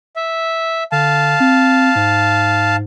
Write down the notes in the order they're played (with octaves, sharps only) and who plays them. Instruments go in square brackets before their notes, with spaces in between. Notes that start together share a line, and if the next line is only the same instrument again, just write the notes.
[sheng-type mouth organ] E5
[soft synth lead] D3 [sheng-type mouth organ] F5 A5
[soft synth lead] C4
G#2